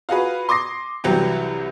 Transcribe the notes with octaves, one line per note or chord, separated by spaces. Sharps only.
F4 F#4 G#4 B4
C6 D6 D#6 A#6 C7
C2 E3 F#3 G3 G4